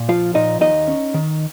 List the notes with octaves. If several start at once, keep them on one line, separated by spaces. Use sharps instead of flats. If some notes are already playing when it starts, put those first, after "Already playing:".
Already playing: A#2
F3 F4 F5
A#2 D#4 D#5
D#2 D#4 D#5
C#4
D#3